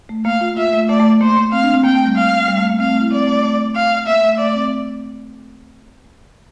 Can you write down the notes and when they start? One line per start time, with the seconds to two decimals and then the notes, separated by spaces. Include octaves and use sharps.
0.09 A3
0.25 A#3 F5
0.41 F4
0.57 F4 E5
0.73 A3
0.89 A3 D5
1.00 A3
1.21 A#3 C5
1.36 A#3
1.52 C4 F5
1.63 D4
1.74 C4
1.84 A#3 G5
1.94 A3
2.05 G3
2.16 F5
2.48 G3
2.58 A3
2.69 A#3
2.79 C4 F5
2.90 A3
3.01 E4
3.11 C4 D5
3.27 A3
3.43 A3
3.75 F5
4.07 A#3 E5
4.22 A3
4.38 A3 D5
4.54 C4